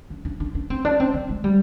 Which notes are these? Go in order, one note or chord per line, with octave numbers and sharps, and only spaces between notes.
D4
D4
D4
D4
C4
D4
C4
C4
G#3
G3